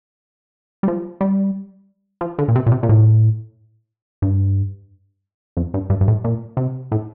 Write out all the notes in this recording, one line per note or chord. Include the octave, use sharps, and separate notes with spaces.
G3
F3
G3
F3
D3
A#2
C3
A#2
C3
A#2
A2
G2
F2
G2
G2
G2
A2
A#2
C3
A2